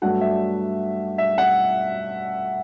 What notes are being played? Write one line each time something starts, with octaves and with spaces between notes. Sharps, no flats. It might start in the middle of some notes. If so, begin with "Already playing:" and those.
G2 F#3 A3 D4 F#5
E5
E5
F#5